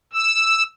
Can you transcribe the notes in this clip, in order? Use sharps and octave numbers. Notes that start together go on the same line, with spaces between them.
E6